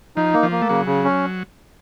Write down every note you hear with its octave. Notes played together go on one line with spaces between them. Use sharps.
F3 D#4
A#3
F3
A#3
A3
C#3 F#3
C#3
C#4